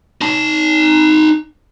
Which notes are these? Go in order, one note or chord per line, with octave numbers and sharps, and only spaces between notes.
D#4 A5